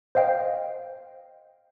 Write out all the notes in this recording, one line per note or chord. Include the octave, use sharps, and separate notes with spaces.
C5 D#5 F5 G5